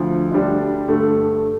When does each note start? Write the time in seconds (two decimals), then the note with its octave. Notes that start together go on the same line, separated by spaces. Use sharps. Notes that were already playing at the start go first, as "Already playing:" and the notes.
Already playing: D2 D3 F3
0.31 D2 D3 G3 D4
0.88 G2 D3 A3